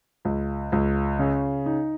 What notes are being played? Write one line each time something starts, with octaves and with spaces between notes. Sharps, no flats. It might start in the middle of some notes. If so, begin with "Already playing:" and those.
C#2
C#2
C#3
D#4